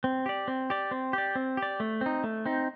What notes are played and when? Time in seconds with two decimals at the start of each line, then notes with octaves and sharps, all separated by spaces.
0.04 C4
0.26 G4 D5
0.48 C4
0.70 G4 D5
0.91 C4
1.13 G4 D5
1.35 C4
1.57 G4
1.63 D5
1.80 A3
2.01 C4 D#4
2.24 A3
2.46 C4 D#4